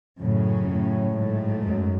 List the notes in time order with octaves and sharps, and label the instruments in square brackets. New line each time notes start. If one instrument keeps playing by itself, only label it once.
[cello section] F#2 C#3 F#3 C#4 [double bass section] A2
[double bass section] A2
[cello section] G#2 F#3 A3
[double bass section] F#2